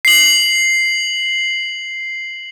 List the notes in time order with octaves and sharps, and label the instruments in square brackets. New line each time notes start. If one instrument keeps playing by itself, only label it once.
[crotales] C7 F#7